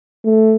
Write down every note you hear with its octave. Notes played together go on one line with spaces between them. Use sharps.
A3